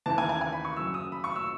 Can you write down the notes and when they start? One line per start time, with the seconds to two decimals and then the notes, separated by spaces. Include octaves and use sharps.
0.06 D#2 C#3 E3 A5
0.18 G#5
0.29 G#5
0.41 G#5
0.52 B5
0.65 C#6
0.76 F#2 C#3 F#3 E6
0.94 D#6
1.12 B5
1.24 C#6
1.36 E6